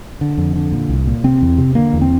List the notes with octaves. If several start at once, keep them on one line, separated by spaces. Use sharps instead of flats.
D3
F2
D3
A#2
C2
A#2
C3 C4
E2
C3
D3 A#3
E2
C4